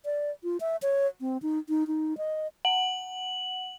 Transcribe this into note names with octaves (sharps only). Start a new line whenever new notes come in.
D5
F4
E5
C#5
C4
D#4
D#4
D#4
D#5
F#5 F#7